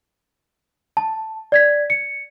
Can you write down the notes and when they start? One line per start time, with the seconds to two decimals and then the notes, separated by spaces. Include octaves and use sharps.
0.97 A5
1.52 D5 G#6 B6
1.90 C#7